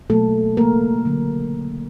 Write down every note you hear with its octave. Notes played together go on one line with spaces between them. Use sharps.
B2 F#3 A3 A#3 A4
C#3 E3 A3 A#3 A#4
D3 F#3 A3